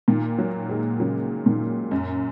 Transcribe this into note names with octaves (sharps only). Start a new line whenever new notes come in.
A#2 D#3
F#3 A#3
D#3 G#3
C#3 F#3
A#2 D#3
F#2